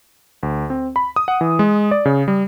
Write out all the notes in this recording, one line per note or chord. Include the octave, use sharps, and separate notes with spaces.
D2
C4
B5
D#6
F#5
E3
G#3
D5
C#3
G3